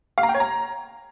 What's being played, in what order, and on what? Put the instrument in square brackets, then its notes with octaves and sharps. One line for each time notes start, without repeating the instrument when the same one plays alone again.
[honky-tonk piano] F5
A#5
G5
C#5
A#5